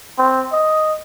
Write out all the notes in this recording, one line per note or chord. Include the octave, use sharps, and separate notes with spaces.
C4
D#5